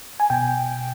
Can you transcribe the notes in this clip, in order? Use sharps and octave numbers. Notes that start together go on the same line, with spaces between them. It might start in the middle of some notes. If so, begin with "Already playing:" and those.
G#5
B2 G5